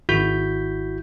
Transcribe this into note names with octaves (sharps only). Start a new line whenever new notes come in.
G#1 E4 F#4 G6 B6